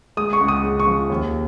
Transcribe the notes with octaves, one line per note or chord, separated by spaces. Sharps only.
G#3 D#6
C#6
C#2
D#6
C#3
C#6
F3
D#2